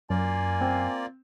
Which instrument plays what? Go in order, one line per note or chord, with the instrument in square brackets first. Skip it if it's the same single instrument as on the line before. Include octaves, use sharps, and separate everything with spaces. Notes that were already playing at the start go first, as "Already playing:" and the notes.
[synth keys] F#2 [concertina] A#3 F4 D5 [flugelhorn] G#5
[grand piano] C4